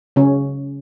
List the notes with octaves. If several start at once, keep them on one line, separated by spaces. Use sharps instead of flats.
C#3 C#4